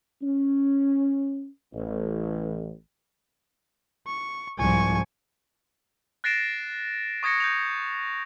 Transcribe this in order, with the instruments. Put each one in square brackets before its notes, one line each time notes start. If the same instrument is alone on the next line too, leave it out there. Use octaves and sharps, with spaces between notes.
[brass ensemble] C#4
A1
[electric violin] C#6
[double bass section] C2 G#2 F3 [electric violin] G#5 C#6
[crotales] F#6 A6 A#6 C7 D7 E7
C#6 D#6 G#6 A#6 C#7
G6 A#6 F7